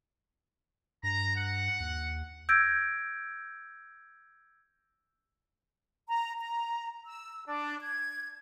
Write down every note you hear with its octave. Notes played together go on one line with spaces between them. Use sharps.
G2 A#5
F#5
D#2
E6 G6 G#6 A#6 D7
A#5
A#5
E6
D4
G#6